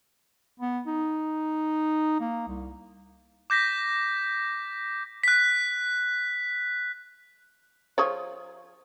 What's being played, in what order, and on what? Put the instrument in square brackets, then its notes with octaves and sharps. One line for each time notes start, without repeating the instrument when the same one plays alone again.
[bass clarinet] B3
D#4
A#3
C2
[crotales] D6 G6 A#6 B6
F#6 B6
[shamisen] F3 G#4 C#5